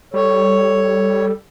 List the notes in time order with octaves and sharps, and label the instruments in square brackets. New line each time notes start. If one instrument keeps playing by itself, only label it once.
[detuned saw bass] G3 [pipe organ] A4 [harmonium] C#5